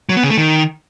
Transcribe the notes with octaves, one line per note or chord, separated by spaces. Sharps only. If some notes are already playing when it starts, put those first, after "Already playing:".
F#3
B3
C#3
A3
D#3